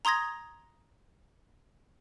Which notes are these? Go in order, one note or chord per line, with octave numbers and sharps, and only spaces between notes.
A#5 C6 D#6 G#6 A#6